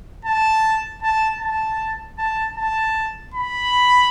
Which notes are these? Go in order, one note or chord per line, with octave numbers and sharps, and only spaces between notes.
A5
A5
A5
A5
A5
B5